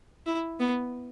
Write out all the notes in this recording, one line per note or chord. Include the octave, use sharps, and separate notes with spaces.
E4
B3